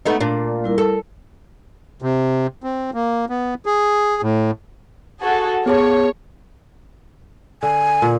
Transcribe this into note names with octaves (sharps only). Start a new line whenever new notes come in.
A3 B3 D#4
A#2 D4
G3 E4 A#4
A4
C3
C4
A#3
B3
G#4
A2
F#4 G#4 A4
B3 G#4 C#5 A5
D3 G#5
A#2